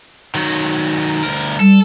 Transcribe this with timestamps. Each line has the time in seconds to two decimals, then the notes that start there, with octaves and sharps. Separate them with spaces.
0.35 D#3 F#3
1.23 D2 A#4
1.60 G3 A4